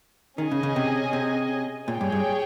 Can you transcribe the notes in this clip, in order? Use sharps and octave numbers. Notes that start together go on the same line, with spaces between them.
D#3 C#4 G#4 D#5 G#5
C#3
C#3
C3
C3
A#2 G#4 C#5 G5
G2
G2